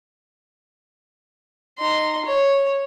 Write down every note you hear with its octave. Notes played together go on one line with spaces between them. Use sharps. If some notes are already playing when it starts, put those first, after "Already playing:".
D#4 C6
C#5